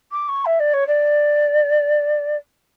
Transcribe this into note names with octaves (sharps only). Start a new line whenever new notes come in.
D6
C#6
E5
D5
C#5
D5